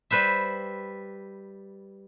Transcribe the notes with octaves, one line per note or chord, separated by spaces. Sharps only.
G3 B4 C5 E5